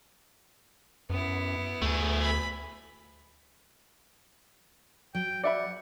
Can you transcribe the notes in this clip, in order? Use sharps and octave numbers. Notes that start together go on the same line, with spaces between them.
F#2 B3 E4
D2 A3 G#4
B5
F#3 G5
D5 E5 F#5 B5